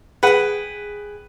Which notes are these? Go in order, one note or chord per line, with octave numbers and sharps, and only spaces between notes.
G#4 B4 F#5 G5